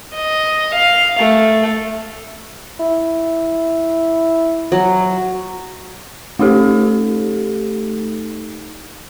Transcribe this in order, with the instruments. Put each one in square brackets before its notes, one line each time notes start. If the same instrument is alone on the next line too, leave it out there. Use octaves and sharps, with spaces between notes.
[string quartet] D#5
F5
A3
[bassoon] E4
[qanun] F#3
[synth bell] A3 D#4 G4 A4